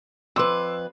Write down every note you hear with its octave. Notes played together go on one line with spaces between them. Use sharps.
F2 B4 C6 D6 E6